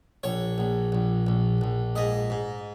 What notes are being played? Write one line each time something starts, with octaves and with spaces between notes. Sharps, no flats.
A#1 C#5
A#1
A#1
A#1
A#1
G#2 D#5
G#2